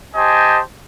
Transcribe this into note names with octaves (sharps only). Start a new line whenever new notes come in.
G4 C5 D#5 G#5 A5